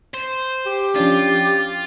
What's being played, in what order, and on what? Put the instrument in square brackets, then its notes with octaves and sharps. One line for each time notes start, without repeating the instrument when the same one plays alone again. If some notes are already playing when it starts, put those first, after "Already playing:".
[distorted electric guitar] C5
[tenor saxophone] G4
[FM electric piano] F3 C#4 D4 [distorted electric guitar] F4